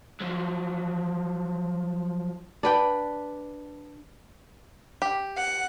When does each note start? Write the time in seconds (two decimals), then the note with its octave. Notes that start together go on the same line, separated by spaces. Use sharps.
0.21 F3 F#3
2.63 D4 B4 G5
5.02 G4
5.35 F#5